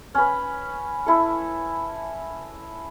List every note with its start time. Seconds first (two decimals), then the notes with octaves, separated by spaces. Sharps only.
0.15 C#4 B4
1.06 E4 A4